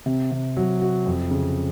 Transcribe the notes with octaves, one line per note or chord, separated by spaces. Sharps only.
C3
C3
F#3
F#4
F2
C#3